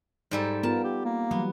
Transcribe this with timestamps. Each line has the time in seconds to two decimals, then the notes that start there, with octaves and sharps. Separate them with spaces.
0.31 G#2 G3 A4
0.63 B3 F4 A#4 A5
0.84 G4
1.05 A#3
1.31 E3 F#3 G3 B3